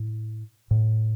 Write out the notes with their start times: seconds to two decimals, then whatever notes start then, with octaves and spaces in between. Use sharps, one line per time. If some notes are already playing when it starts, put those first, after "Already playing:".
Already playing: A2
0.71 A2